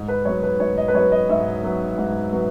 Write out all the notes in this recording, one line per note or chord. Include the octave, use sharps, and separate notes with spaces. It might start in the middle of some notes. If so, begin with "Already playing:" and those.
Already playing: G#2
B4
F#3 B3 C#5
B4
G#2 C#5
D#5
B4
F#3 C#5
B3
D#5
G#2 E5
F#3 B3
G#2
F#3 B3